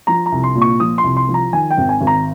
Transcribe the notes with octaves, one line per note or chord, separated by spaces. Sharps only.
F3 A#5
A#5
C2
C6
A#2
C#6
F3 D#6
C6
C2
C6
F3
A#5
D#3 G#5
G5
G#1
G#5
G#1
A#5